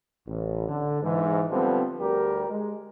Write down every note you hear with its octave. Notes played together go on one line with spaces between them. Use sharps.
A1
D3
G#2 E3
D3 F3 G3 B3 C4
D2 G3 G4 A#4
G#3